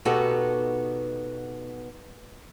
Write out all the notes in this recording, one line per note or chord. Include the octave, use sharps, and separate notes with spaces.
B2 B3 D#4 F#4 G4 A4